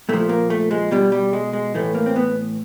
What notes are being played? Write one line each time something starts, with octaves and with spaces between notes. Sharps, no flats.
A#2 F3 A3
A#3
A3
G#3
B2 G3
G3
G#3
G#3
A2 E3 A3
A#3
C4
B3